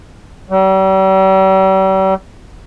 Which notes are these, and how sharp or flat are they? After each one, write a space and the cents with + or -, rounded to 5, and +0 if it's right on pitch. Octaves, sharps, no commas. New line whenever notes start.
G3 -40